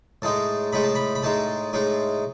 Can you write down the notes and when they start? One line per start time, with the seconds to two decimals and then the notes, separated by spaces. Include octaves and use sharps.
0.22 A2 G#3 D#4 A5
0.72 A2 G#3 D#4 B5
0.83 A5
0.95 B5
1.15 B5
1.23 A2 G#3 D#4 A5
1.73 A2 G#3 D#4